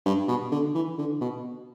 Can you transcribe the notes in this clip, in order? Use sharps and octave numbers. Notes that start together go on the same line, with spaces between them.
G2
B2
D3
E3
D3
B2